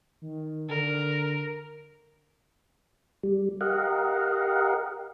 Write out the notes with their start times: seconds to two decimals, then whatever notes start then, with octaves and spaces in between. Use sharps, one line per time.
0.22 D#3
0.69 D3 A#4
3.23 G3
3.61 G4 A#4 D#5 F5 F#5